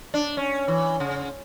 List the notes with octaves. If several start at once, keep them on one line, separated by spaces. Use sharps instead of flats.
D4
C#4
E3
C#3